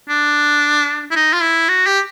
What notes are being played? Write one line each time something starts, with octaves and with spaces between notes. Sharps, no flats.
D4
E4
D#4
F4
E4
F#4
G4